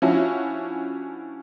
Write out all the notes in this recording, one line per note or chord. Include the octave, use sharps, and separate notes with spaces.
F3 C#4 D4 E4 F#4